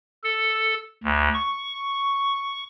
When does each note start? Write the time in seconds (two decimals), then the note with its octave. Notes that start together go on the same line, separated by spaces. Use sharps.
0.24 A4
1.04 D2
1.34 C#6